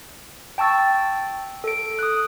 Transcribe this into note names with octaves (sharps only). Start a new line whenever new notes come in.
G5 A5 C#6 E6 A6
A4 D7
D#6 F#6